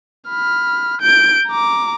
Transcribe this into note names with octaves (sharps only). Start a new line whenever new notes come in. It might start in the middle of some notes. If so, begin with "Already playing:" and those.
B5 F6
G6 D7
A#5 D6